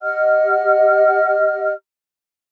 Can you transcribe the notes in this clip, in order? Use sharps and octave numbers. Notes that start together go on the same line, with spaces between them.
G4 D#5 F#5 F6